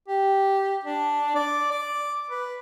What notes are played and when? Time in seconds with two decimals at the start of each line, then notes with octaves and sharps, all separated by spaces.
0.08 G4
0.84 D4
1.36 D5
1.72 D6
2.31 B4